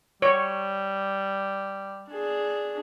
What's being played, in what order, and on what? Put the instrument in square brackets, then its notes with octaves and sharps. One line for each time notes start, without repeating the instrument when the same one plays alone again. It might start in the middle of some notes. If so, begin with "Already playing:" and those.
[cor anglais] G3 [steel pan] C#5
[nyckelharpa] D4 G#4